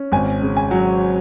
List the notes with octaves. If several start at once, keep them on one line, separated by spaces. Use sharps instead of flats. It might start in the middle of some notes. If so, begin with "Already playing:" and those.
Already playing: C#4
G#1 G#5
C#3
G#5
F#3